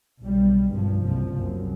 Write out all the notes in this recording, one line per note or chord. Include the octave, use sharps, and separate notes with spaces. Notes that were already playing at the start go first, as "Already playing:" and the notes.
B1 G3
G#1 G2 F3
F#1 C2 F3
C2 F#2